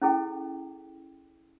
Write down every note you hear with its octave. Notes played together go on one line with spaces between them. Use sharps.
C#4 E4 G#4 A4 G5